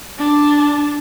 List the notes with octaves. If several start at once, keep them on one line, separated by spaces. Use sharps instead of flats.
D4 A5